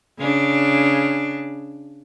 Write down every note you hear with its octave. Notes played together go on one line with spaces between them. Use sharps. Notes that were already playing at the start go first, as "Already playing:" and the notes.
C#3 D4